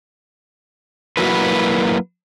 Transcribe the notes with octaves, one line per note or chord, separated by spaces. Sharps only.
F#3 A#3 E4 F#4 B4